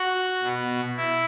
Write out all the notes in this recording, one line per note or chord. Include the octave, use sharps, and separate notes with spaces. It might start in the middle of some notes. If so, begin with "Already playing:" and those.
Already playing: F#4
B2
E4